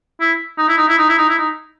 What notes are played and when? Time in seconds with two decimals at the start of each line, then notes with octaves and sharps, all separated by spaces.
0.20 E4
0.58 D#4
0.69 E4
0.78 D#4
0.88 E4
0.99 D#4
1.09 E4
1.18 D#4
1.29 E4
1.39 D#4